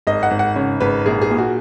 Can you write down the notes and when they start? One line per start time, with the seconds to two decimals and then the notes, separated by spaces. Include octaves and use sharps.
0.07 G#1 D#5
0.23 F#5
0.31 G#1
0.39 F#5
0.56 C#3 C#5
0.80 G#1 B4
1.06 A#1 G#4
1.21 G#4
1.30 A#2
1.38 F#4